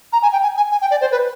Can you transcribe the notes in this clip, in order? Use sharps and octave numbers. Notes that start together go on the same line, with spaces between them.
A#5
G#5
G5
G#5
G#5
G#5
G5
D5
C5
B4